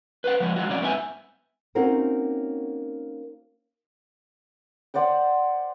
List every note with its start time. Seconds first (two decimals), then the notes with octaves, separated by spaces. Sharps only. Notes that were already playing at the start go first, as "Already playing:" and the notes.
0.24 B4 C5 F#5
0.40 F3 G#3 B3
0.56 F3 F#3 G#3 F#4
0.69 F2 C3 F#3 C#4 F#4 D5
0.81 G#2 B3 C4 E5 G#5
1.75 A#3 C4 C#4 D#4 F#4 A#4
4.94 C5 D5 F#5 G5